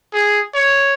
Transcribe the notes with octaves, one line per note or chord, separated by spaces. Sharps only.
G#4
C#5